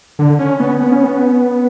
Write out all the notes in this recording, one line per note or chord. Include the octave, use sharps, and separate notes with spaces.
D3
C#4
B3
B3
C#4
B3